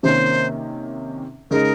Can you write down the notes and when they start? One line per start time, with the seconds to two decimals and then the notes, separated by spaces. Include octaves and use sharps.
0.03 C3 D#3 A#3 C#4 C5
1.51 C#3 G#3 D#4 A#4